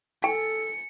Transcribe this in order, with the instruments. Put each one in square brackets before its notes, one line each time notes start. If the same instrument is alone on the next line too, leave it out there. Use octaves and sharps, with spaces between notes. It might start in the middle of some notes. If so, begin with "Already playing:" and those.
[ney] A4 [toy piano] G#5 [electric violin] C#7